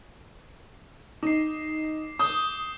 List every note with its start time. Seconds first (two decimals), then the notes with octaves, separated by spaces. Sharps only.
1.23 D#4 D6 C7
2.19 D6 D#6 G6 G7